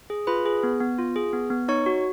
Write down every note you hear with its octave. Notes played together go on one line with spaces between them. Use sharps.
G#4
F4 B4 B5
G#4
B3
B3
F4
G#4
B3
B3
D#4 C#5 C#6
F#4